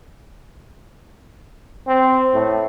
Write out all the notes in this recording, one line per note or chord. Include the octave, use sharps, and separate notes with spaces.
C4
A2